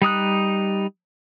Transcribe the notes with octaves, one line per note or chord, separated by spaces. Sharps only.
G3 D#4 D#6 F#6